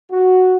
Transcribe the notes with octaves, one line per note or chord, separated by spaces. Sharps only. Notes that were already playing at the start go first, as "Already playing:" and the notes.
F#4